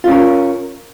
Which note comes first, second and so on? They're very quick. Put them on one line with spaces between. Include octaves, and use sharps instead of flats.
F4 C#4 A#4